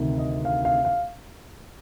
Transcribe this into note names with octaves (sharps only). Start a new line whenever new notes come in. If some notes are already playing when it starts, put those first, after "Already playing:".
Already playing: D2 C3 D#3
D#5
F5
F5
F5